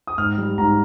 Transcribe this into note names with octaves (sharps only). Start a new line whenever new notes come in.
D#6
G#2 F6
G3
G#2 A#5